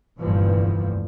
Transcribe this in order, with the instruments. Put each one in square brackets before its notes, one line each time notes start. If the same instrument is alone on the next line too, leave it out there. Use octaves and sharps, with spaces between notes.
[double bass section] F1 D2 G2 A#2 E3 F3